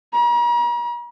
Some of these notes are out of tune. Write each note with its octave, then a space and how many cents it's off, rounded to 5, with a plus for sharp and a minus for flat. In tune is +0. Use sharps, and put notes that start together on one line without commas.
A#5 +40